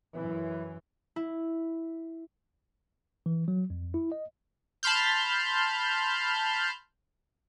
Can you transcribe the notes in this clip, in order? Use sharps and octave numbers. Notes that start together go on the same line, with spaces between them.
F#2 E3
E4
E3
F#3
F2
E4
D#5
A5 B5 C6 F6 G6